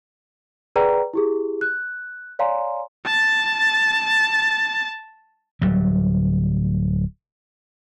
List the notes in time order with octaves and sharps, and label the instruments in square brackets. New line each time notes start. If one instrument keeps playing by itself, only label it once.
[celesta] G#4 B4 D5 F#5 G5 A#5
E4 G4 G#4
F#6
C#5 D5 F5 G#5 A#5 C6
[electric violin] A5 A6
[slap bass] D1 F#3 G3